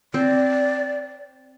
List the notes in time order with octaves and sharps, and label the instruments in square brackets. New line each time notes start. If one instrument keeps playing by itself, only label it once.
[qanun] C4 [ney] D5